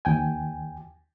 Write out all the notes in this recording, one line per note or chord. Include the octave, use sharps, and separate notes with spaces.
D#2 G5 G#5